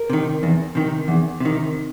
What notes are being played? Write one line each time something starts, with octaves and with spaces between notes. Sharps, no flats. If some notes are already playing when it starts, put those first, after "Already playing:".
Already playing: A#4
C3 D#3
E2
C3 D#3
E2
C3 D#3